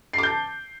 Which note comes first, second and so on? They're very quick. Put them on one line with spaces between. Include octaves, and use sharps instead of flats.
C7 D6 G6 A5